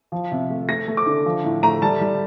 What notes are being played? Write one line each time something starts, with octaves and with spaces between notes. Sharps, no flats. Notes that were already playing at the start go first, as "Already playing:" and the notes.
F3
C3
A3
A3 A#6
A3
D6
D3
F3
A2
A3 A#5
G3 A5
G3